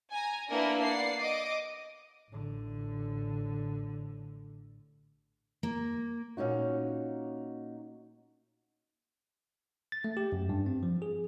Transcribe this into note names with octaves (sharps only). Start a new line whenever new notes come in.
G#5 A#5
A#3 B3 D4 E4 A#4 B4
D5 F#5 C7
D#5 D6
A1 D3
A#3
A#2 C#4 D#4 F#4
A6
A3
G4
F#2
G2
C4
F3
G#4